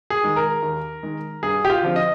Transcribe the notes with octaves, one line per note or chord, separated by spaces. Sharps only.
G#4
D#3 G#3
A#4
D#2
D#3 G#3
G2 G#4
G4
F4
D3 F3 C4
D#5